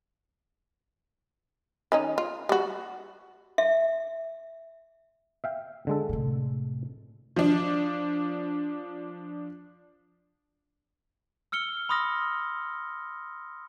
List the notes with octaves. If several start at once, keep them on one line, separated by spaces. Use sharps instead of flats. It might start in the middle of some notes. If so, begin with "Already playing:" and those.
D#3 C#4 D#4
F4
G3 F#4
E5
E5 F5 G5
D3 G#3 A4
A2 C3
F3 D4
E6 F6 C#7 G7
B5 C6 D#6 F6 A#6